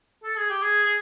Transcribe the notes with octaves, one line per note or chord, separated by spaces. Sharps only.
A4
G#4
G4
G#4
G#4